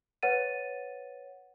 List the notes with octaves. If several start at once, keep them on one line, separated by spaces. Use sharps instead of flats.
B4 C#5 F#5 A6 D#7